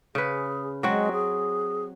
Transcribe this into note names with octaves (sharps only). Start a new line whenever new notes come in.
C#3 G#4 B4
F#3 G#3 C4 F#4
G#4